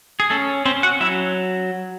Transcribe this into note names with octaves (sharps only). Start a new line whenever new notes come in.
G#4
A3 C#4 A4
C4 C#4 C5
F#4 F#5
F#3 E4 E5